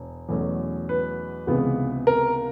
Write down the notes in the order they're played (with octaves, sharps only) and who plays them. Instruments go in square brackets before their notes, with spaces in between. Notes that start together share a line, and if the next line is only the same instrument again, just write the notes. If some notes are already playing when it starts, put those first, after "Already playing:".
Already playing: [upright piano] E1
E2 B2 F#3 A3 C#4
B4
C#2 C3 E3 G#3 B3
A#4